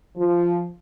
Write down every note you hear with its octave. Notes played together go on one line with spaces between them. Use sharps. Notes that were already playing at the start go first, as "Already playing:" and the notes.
F3